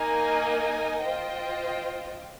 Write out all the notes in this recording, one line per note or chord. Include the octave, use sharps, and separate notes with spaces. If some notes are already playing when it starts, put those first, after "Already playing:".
Already playing: A#3 D#4 A#4 D#5 G#5
F4 C5 D#5 G5